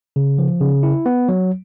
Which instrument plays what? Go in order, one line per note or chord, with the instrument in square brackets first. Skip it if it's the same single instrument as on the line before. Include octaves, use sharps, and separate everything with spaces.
[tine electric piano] C#3
F3
C#3
E4
B3
F#3